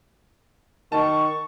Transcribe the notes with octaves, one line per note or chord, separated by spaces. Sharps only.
D#3 A5 C#6